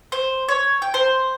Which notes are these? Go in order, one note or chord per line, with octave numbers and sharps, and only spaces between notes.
C5
C#5
G5
C5